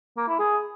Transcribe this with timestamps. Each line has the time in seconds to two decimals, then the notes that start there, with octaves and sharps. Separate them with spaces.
0.17 A#3
0.28 E4
0.39 G#4